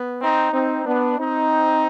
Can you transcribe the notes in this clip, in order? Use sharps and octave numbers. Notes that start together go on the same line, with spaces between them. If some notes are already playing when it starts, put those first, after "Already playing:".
Already playing: B3
C4 D#4
C4 D#4
B3 D4
C4 D#4